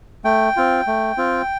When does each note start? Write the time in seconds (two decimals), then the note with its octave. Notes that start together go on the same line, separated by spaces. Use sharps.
0.25 A3 G5
0.57 C4 F4
0.87 A3
1.17 C4 F4